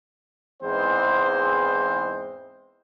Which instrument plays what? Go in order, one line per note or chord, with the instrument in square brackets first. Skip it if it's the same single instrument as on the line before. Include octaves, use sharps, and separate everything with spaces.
[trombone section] E2 G#2 E3 G#3 C4 C5